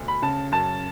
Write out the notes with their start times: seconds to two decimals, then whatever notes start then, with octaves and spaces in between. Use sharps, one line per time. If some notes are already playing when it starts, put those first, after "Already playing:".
Already playing: D2 B2
0.08 B5
0.22 C#3 A5
0.52 F#2 A5